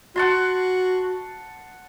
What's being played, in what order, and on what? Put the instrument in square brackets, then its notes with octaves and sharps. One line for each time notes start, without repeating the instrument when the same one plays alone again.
[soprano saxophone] F#4 [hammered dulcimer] F#5 A5 C6